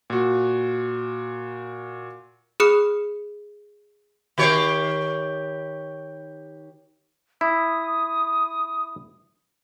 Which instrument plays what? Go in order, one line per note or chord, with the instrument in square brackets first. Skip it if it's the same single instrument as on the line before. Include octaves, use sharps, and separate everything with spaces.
[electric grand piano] A#2 F#4
[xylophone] G#4 B5 D#6 F6 F#6 C#7
[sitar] D#3 G4 C#5
[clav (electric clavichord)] E4 [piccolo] D#6